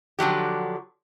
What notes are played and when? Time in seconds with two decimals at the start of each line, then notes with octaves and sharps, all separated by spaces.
0.19 D3 F3 F#3 G4